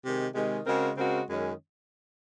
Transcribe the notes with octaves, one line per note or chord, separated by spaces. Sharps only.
C3 D#3 G#3
C3 D#3 G#3
C#3 G#3 C4 F#4 A#4
C#3 G#3 C4 F#4 A#4
F#2 D#3 G#3 C#4